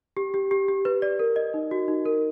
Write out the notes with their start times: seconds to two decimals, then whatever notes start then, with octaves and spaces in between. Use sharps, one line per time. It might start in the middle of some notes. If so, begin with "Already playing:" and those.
0.17 G4
0.34 G4
0.51 G4
0.68 G4
0.85 B4
1.02 D5
1.19 A#4
1.36 D#5
1.54 D#4
1.71 F#4
1.88 D#4
2.05 A#4